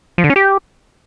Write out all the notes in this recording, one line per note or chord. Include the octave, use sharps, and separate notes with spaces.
F3
D3
C#4
G4